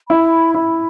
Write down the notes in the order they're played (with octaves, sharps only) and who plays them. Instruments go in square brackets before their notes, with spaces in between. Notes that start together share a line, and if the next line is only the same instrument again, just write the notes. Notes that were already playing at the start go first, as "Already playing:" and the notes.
[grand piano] E4 [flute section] B5
[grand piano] E4 [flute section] B5